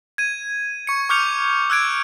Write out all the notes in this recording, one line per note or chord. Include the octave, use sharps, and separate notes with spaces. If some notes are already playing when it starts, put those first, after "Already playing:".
G#6 D#7
C#6 C#7
C#6 D6 F6 G6 C#7 F7
E6 F#6 G#6 D7